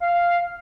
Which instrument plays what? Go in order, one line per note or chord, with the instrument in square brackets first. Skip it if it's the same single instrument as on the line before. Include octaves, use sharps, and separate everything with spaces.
[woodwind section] F5